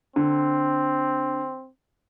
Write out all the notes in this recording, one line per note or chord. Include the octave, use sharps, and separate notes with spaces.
D3 C4